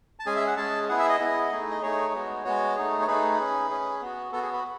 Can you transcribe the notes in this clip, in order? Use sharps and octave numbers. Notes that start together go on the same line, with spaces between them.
A5
G#3 C#4 G#4 G#5
E5
F#5
G#3 C#4 G#4 A5
B3 E4 G#4 F#5
E5
D#5
B3 E4 G#4
A3 D#4 G#4
D#5
A3 D#4 G#4 C#5
G#3 B3 F#4
G#3 B3 F#4 C#5
A3 D#4 G#4
C#5
A3 D#4 G#4 B4
C#4 G#4
C#4 G#4
B3 F#4
B3 F#4 A4
G#4
B4